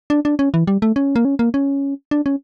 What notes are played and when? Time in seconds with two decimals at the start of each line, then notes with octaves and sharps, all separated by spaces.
0.10 D4
0.25 D4
0.39 C#4
0.54 E3
0.67 G3
0.82 A3
0.96 C#4
1.16 A#3
1.25 C#4
1.39 A#3
1.54 C#4
2.11 D4
2.26 C#4